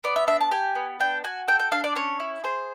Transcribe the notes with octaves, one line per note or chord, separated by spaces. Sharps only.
B3 D5
E5
D4 E5
A5
G4 G#5
B3
D4 G5
F#4 G#5
A4 G5
G5
D4 F5
D5
C#4 C#5
E4
G#4 C5